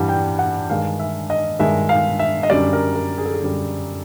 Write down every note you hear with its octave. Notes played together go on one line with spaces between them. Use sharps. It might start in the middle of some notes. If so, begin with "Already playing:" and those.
Already playing: G2 E3 G3 F#5
G5
F#5
G2 D#3 G#3 F5
E5
D#5
G2 D#3 G#3 E5
F5
E5
D#5
F#2 D3 G3 D5
A#4
A#4
G#4
A4
G#4
F#2 D3 G3